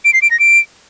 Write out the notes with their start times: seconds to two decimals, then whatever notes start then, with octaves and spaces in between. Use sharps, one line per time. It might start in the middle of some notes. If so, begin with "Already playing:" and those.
0.05 D7
0.14 C7
0.22 D7
0.31 A#6
0.40 D7